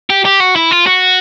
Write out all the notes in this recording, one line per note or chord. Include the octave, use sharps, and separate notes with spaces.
G4
G4
F#4
E4
F4
F#4